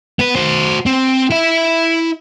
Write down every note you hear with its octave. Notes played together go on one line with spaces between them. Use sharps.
B3 B4
F#4 C5
C4
E4 E5